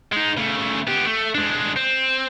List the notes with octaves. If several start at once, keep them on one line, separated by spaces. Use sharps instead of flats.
G#3 D#4
C#3 A3
B3 G4
A3
G#3 D4
C4